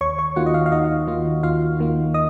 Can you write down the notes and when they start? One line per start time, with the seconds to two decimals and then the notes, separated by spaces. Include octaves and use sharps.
0.01 D#2 C#5 C#6
0.19 C#5 C#6
0.36 D#3 A#3 F4 F#4 F#5
0.46 D#5
0.54 F4 F5
0.66 F5
0.72 D#2 D#4 D#5
1.07 D#3 A#3 F4
1.43 D#2 F4 F5
1.79 D#3 A#3 F4
2.14 D#5 D#6